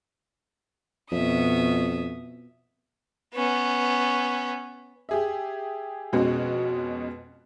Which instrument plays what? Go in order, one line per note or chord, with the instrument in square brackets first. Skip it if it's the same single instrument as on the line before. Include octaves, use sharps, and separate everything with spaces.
[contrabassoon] F2 [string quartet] B2 E5 D#6
[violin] B3 C#4
[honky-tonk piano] G4 G#4 E5
F2 B2 G#3 C#4 F#4